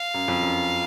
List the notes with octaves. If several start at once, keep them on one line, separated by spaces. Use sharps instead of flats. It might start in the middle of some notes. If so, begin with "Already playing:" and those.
Already playing: F5
F#2
F2
F#2